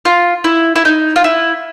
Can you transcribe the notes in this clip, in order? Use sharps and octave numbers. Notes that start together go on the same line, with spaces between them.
F4
E4
E4
D#4
F4
E4